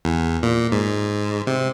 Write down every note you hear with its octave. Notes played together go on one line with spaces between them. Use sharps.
E2
A#2
G#2
C3